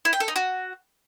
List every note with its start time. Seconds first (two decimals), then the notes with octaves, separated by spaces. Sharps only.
0.05 E4
0.13 G5
0.20 A4
0.28 D#4
0.36 F#4